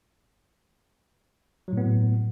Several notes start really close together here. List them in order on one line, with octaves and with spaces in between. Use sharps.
F#3 A2 B3